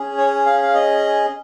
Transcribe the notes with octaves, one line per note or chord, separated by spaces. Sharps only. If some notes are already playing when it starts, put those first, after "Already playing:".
Already playing: C#4 G#4
C#5
F5
F5
D#5